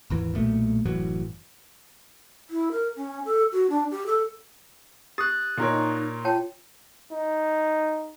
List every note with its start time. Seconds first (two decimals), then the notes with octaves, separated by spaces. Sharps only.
0.10 G#1 D#2 E3
0.34 B1 A#2 A3
0.86 F#1 A2 E3 F#3
2.50 E4
2.71 A#4
2.96 C#4
3.25 A4
3.52 F#4
3.70 D4
3.91 G4
4.06 A4
5.18 G4 D#6 F#6 A6
5.57 A#2 D#4 A#4 C#5
6.25 F4 C#5 G5 A5
7.12 D#4